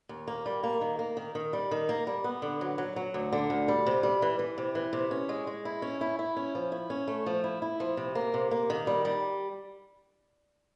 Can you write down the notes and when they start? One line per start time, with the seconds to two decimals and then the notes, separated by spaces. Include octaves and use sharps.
0.09 D#2
0.28 A#3
0.46 G3
0.63 A#3
0.81 D#3
0.99 A#3
1.17 D#3
1.35 D#3
1.53 G3
1.71 D#3
1.89 A#3
2.07 G3
2.24 B3
2.42 D3
2.61 F#3
2.78 F#3
2.96 F#3
3.14 D2
3.33 D3
3.50 D2
3.68 G3
3.86 C3
4.03 G3
4.22 E3
4.39 E3
4.58 C3
4.75 E3
4.93 C3
5.11 C#4
5.29 G#3
5.47 G#3
5.65 E4
5.82 C#4
6.01 E4
6.19 E4
6.37 C#4
6.55 F3
6.72 E4
6.90 C#4
7.08 A3
7.26 F3
7.44 E4
7.62 E4
7.80 F3
7.97 C3
8.15 A#3
8.34 C3
8.51 A#3
8.70 D#3
8.87 G3
9.05 G3